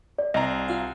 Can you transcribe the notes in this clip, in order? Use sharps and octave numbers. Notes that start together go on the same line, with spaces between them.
D5
C2 D#5 A#5
F4 F5